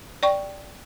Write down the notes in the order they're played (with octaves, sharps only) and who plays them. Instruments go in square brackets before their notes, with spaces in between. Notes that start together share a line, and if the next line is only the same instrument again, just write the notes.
[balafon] D5 G5 C#6